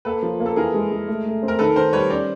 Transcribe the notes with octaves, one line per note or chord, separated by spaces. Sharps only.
A#3 A4 B4
F3
A#3
A4
E3 G#4 A#4
G#3
G#3
A3
A3
C4
A#4
D#3 A4 B4
D#3 A#4 C5
G3 B4 C#5
C#4 C5 D5